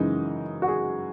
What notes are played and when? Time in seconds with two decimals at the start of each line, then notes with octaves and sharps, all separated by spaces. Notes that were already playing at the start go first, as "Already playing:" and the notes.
Already playing: F#2 C#3 E3 G#3 D#4
0.62 F#4
0.68 G#4